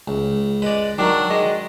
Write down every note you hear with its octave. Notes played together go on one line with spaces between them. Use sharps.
C#2
G#3 B4 D5
D#3 F#3 D4
G#3